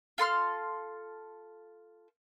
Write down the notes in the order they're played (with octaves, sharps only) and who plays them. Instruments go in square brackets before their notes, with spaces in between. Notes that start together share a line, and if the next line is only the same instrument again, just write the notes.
[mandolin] F4 A4 C6 F6